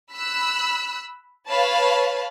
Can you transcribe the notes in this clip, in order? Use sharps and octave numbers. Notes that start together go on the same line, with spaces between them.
B5 E6 F#6
B4 C#5 F5 A5 B5